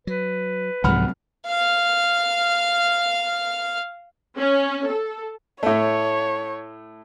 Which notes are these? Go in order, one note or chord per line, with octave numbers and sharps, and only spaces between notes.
F#3 B4
C2 G#2 F3 F#3 C4 F#5 B5 F6
F5 F6
C#4
A4
A2 A3 C#5